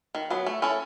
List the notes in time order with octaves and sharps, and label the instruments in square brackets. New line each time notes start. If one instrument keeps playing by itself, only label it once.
[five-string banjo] D#3
F#3 B3
A3
C#4 E4 A4